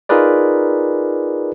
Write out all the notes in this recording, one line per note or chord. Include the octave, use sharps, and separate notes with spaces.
D#4 F4 G#4 A#4 B4 D5